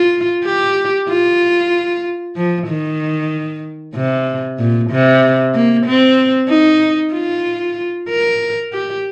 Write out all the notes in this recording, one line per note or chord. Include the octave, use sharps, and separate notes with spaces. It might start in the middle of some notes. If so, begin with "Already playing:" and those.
Already playing: F4
G4
F4
F3
D#3
C3
A#2
C3
A#3
C4
D#4
F4
A#4
G4